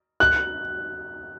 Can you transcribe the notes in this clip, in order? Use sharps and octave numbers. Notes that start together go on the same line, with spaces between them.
F#6